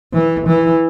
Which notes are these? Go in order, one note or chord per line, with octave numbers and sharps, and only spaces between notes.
E3
E3